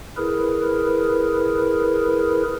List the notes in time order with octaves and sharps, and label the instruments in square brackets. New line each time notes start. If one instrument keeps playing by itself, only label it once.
[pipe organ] E4 G#4 A#4 B4